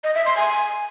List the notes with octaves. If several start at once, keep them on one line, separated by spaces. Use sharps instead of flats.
D#5
E5
C6
G#5